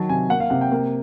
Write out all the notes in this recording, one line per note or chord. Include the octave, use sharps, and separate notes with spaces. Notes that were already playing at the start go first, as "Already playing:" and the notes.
Already playing: D#3 F#3 A5
C3 G#5
A#3 F#5
F5
C3 F#5
G5
A#3